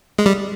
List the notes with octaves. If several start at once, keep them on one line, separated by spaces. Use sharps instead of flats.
G#3
G3